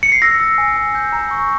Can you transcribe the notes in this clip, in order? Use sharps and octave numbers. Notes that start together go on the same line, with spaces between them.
C#7
C7
E6 A#6
E6
G#5
G#5
G6
A#5
C#6